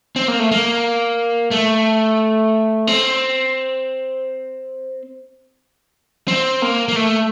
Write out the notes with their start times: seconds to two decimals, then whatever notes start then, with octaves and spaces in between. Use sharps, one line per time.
0.16 C4
0.28 A#3
0.39 A3
0.51 A#3
1.51 A3
2.87 C4
6.28 C4
6.62 A#3
6.88 A#3
6.96 A3